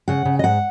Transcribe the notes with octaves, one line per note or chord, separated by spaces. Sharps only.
C#3 F#5
C#3
D#5
G#2 F#5